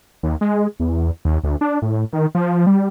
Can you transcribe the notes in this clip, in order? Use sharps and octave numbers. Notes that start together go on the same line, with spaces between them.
D#2
G#3
E2
D#2
D2
D4
A2
D#3
F3
G3